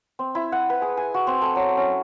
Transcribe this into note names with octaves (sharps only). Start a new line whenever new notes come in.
C4
E4
F#5
B4
G#4
G#5
F#4
C4
A4
F#3
C#4